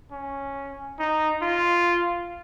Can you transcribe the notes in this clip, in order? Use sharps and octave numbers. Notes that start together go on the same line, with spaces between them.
C#4
D#4
F4